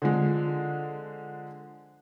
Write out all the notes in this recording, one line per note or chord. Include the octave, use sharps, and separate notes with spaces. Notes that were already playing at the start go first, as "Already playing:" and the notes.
D3 F3 G#3